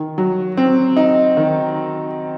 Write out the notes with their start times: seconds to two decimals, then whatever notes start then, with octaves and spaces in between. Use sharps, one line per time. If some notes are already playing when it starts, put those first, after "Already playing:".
Already playing: D#3
0.18 F#3
0.57 C4
0.97 D#4
1.37 D#3